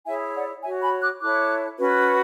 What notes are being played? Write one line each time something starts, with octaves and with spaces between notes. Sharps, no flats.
E4 G#4 C#5 E5 G#5
D5 F#5
F#4 C#5 E5 G#5
G#5 B5
D6 F#6
E4 A4 C#5 D6 F#6
C#4 F#4 B4